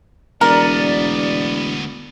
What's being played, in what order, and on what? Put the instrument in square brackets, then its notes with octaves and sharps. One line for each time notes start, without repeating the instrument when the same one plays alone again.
[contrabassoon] E1 [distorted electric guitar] D2 B3 [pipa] A#4 [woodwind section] D5